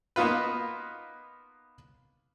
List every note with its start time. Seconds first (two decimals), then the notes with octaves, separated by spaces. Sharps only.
0.16 A#3 B3 D#4 F4 B4